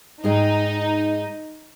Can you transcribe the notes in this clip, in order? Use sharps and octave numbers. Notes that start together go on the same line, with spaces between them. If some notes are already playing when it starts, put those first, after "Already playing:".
G#2 D#4 G#4 G5